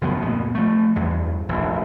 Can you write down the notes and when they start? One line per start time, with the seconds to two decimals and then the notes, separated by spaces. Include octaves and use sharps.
0.01 C#2 F#2 F3 B3
0.21 D2 A#2 G#3 B3
0.55 F3 A3
0.96 E2 G2
1.49 F1 A#1 D#2